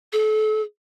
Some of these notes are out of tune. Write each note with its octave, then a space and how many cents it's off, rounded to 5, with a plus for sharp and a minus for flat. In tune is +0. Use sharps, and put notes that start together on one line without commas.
A4 -35